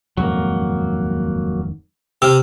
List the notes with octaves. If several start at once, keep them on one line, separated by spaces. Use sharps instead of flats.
D#1 F2 G#2 F#3 A#3
C3 E6 F6